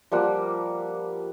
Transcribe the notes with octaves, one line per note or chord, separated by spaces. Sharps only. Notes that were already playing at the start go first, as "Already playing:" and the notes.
F3 G3 A#3 F#5